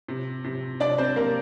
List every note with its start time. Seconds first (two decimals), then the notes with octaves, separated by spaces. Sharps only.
0.08 C3
0.44 C3
0.80 C3 D4 D5
0.98 C4 C5
1.16 C3 A#3 A#4